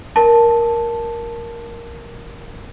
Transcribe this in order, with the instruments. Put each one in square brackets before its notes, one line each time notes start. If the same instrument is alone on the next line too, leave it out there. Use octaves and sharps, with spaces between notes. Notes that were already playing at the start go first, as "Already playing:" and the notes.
[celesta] A#4 A5